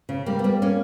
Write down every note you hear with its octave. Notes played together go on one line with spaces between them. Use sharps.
C#3
G3 A#3
B3
G3 A#3
A#3 C#4